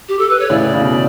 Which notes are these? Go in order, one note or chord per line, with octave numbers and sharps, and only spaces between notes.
G4
A4
B4
C#5
A2 C#3 D5
C#3
B2